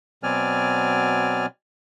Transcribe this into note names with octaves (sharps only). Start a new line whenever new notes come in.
B2 F#3 C4 D5 G#5 F6